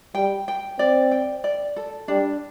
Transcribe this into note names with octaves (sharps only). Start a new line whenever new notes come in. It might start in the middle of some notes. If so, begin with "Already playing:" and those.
G3 G5
G5
C4 D5
G5
D5
A4
G3 D4